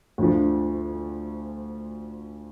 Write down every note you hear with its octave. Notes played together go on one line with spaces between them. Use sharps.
D2 D3 F3